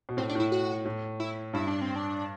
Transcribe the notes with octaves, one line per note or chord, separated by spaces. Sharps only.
B2
A2 C4
D4
A2 E4
F#4
A2
E4
G2 E4
D4
C4
D4